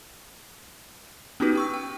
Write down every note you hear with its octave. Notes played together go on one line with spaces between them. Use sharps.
B3 C#4 D#4 F#4 G4 B4
G5 C#6 E6
G5